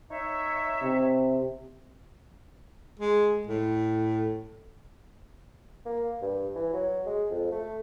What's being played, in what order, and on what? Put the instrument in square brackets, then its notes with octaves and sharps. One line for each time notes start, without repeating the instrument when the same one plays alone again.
[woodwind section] D#4 C#5 E5
[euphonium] C3
[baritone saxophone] G#3
A2
[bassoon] A#3
G2
E3
F#3
G#3
F2
A3